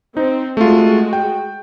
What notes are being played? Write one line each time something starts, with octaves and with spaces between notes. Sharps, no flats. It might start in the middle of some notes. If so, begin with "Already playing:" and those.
C4 D#4
G#3 A3 F4 F#4
G5